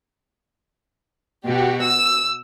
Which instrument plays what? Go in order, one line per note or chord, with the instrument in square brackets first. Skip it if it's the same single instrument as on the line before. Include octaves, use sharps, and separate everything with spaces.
[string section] B2 F#4 G4
E6